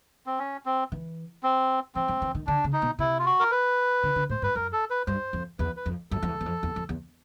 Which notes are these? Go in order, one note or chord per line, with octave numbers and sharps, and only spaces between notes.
C4
C#4
C4
E3
C4
F3 C4
F#3
E3
D#3
D3 D4
C#3
D#4
B2
C3 E4
F4
F#4
A#4
B4
D3
D3
A2 C5
G2 B4
F#2 A#4
A4
B4
G2 C5
F2
E2 B4
B4
F2
F#2 A4
F2
E2
E2
F2
E2
F2
E2